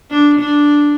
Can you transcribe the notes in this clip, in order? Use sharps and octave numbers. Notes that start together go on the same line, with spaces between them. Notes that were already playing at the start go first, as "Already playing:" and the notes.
D4
D4